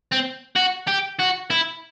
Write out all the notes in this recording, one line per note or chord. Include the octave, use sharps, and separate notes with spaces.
C4
F#4
G4
F#4
E4